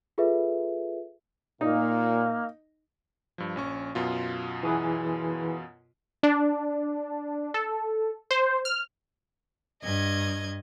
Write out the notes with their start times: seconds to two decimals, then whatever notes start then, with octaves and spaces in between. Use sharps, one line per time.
0.18 F4 G#4 A4 B4 E5
1.61 A#2 A#3 D#4
3.38 G2 F3
3.56 A#1 C#4 C#6
3.95 F#2 B2 F4
4.63 E3 G#4 B4
6.23 D4
7.54 A4
8.31 C5
8.65 F6
9.83 G2 D#5 G#6